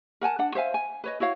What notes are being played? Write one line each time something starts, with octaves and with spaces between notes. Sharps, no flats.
A#4 F#5 G#5 A5
D4 F#5
C5 E5 F5 G#5
G#5
B4 C#5 D#5
E4 F#4 C#5 F5